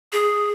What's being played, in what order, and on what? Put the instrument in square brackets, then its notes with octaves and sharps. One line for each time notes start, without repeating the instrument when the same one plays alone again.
[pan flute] G#4